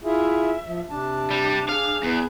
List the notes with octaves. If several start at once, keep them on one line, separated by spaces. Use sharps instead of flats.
E4 F4 G#4 E5
F3
C3 D4 A5
G3
G#4 F5
E2 B3